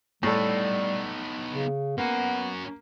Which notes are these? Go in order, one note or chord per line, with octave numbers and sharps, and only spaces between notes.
A2 G3 B3 D#4 A4
C#3
A#3 B3 C#4 F#4